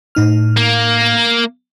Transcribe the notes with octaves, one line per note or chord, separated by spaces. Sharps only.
A2 D#4 F6
A#3